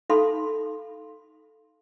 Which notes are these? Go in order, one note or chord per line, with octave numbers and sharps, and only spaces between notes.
D#4 A4 F5 B5 C6 D#6